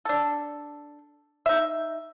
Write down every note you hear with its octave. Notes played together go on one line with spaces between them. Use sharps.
D4 A4
D#4 E5